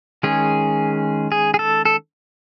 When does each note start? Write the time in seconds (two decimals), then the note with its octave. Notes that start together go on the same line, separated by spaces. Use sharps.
0.23 D#3 G#3 C#4 G#4
1.32 G#4
1.54 G#4
1.59 A4
1.85 A4